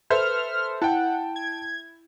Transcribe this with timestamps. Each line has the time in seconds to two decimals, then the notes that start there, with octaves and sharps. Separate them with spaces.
0.10 A4 B4 C5 E5 F6
0.82 E4 F#5 G5 A5
1.36 G#6